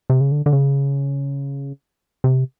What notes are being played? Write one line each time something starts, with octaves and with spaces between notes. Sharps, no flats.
C3
C#3
D3
D3
C#3
C3